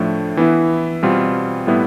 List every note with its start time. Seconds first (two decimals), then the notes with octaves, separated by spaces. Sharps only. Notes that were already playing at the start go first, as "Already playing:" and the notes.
Already playing: A2 F3 A3 D4
0.37 E3 B3 E4
1.03 B2 G3 C4 F4
1.67 A2 G3 B3 E4